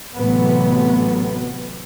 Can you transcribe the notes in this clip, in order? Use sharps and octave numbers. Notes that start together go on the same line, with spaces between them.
A1 C3 F#3 A3 B3